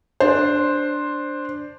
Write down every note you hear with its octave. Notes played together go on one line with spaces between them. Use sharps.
D4 C5